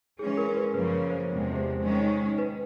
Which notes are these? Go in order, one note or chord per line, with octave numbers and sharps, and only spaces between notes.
E3 G#3 C#4 G#4
A#4
B4
F#2 C#3 F3 A#3 C#4 B4
C#5
C5
E2 C3 F3 G#3
C5
D#3 G#3 C#4
B4